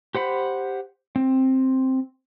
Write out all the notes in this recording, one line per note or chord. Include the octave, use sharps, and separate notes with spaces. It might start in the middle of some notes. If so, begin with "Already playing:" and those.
G4 C5 F#5 B5
C4